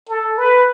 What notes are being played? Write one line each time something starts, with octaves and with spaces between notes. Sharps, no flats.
A4
B4